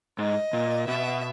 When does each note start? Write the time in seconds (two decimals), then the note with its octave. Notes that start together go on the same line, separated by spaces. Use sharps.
0.19 G#2 D#5
0.53 A#2
0.88 B2 E5